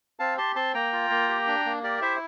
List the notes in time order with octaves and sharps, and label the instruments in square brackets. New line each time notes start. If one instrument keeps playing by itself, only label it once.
[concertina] C4 F5 A5
G4 A5 C6
C4 A5 C6
A#3 G5 A#5
F4
A#3
G4
D4
A#3
G4 A#4 D5
E4 C5 E5